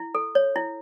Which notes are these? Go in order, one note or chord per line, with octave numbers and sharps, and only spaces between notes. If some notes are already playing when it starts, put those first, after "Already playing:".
Already playing: E4
A4
C#5
E4